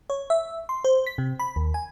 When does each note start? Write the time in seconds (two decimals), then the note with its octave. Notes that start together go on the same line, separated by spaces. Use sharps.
0.10 C#5
0.30 E5
0.69 C6
0.84 C5
1.07 B6
1.18 C3
1.39 B5
1.56 D#2
1.74 G#5